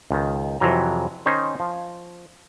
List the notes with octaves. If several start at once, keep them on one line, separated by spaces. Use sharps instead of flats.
C#2 D#3
F2 C3 E3 F#3 A#5
D#3 C#4 D#4 C5
F3